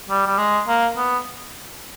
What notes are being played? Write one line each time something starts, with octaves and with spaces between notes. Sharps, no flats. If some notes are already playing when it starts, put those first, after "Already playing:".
G3
G3
G#3
A#3
B3